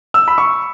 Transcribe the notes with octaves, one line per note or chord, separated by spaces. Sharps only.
E6
B5
C#6